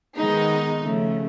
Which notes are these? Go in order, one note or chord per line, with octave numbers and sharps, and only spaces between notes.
D#3 G#3 B3 D#4
C#3 F3 A3